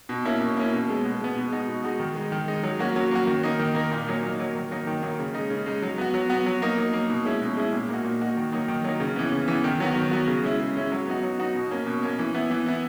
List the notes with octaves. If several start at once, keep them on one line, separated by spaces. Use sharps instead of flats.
B2
A#3 C#4 E4
B2
A#3 C#4 E4
B2
G#3 B3
B2
G#3 B3
B2
G#3 D#4 F#4
B2
G#3 D#4 F#4
D#3
G#3 D#4
D#3
G#3 D#4
F#3
A#3 C#4 F#4
F#3
A#3 C#4 F#4
D#3
A#3 D#4
D#3
A#3 D#4
A#2
F#3 A#3 D#4
A#2
F#3 A#3 D#4
D#3
F#3 A#3 D#4
D#3
F#3 A#3 D#4
C#3
G#3 D#4
C#3
G#3 D#4
F#3
B3 F#4
F#3
B3 F#4
F#3
A#3 D#4
F#3
A#3 D#4
B2
G#3 C#4 E4
B2
G#3 C#4 E4
A#2
A#3 D#4 F#4
A#2
A#3 D#4 F#4
D#3
F#3 A#3 D#4
D#3
F#3 A#3 D#4
C#3
E3 B3
C#3
E3 B3
D#3
F#3 B3 F#4
D#3
F#3 B3 F#4
C#3
G#3 C#4 E4
C#3
G#3 C#4 E4
F#3
B3 D#4 F#4
F#3
B3 D#4 F#4
B2
A#3 C#4
B2
A#3 C#4
E3
B3 E4
E3
B3 E4